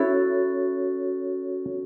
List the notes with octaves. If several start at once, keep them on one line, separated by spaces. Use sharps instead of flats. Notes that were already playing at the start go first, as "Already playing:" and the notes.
Already playing: C#4 E4 F#4 A4 C#5